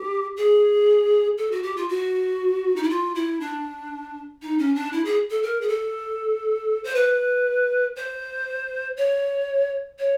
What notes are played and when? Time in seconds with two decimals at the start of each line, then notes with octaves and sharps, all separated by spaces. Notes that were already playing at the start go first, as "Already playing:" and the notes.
Already playing: G4
0.37 G#4
1.38 A4
1.52 F#4
1.63 G4
1.77 F4
1.89 F#4
2.76 D#4
2.83 E4
2.90 F4
3.15 E4
3.40 D4
4.42 D#4
4.59 C#4
4.75 D4
4.93 E4
5.05 G#4
5.30 A4
5.43 A#4
5.61 G#4
5.68 A4
6.84 C5
6.95 B4
7.96 C5
8.97 C#5
9.99 C#5